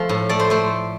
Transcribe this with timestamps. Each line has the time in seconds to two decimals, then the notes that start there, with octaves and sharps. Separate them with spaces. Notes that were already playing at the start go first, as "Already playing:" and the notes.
Already playing: F3 A3
0.09 A2
0.29 A3 D5
0.40 C5
0.50 A3 C5